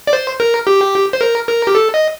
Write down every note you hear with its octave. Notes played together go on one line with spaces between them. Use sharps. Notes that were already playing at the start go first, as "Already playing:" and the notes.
D5
C5
A#4
G4
C5
A#4
A#4
G4
A4
D#5